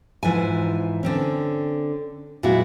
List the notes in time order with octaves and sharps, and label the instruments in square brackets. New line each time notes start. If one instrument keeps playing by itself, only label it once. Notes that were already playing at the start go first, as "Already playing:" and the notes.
[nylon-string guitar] G#2 E3 F3 G#5
D3 C4 C#4
A#2 F#3 G#3 B3 E4 F#4